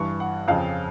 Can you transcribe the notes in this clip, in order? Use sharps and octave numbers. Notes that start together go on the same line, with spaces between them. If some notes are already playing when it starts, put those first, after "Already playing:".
Already playing: G2 E3 C#6
F#5
F2 C#3 F3 F5